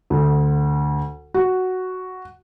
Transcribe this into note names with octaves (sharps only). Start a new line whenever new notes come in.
D2
F#4